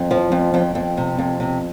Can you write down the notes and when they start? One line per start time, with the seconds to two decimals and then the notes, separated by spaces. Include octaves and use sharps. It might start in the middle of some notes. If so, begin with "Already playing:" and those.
Already playing: F2
0.11 F3
0.32 F2
0.54 F2 G5
0.75 F2
0.97 C3
1.19 F2
1.40 C3